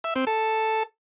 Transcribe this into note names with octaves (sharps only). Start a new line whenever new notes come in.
E5
C4
A4